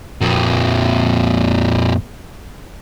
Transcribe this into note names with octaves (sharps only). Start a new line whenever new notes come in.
F2 A#2